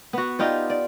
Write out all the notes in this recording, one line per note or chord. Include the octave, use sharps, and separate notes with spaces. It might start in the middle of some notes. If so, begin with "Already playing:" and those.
B3 F#4
D#4 F4 G4 D5
D5